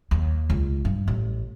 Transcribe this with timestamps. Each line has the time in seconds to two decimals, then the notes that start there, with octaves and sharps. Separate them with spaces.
0.11 D#2
0.50 C#2
0.85 G2
1.08 A1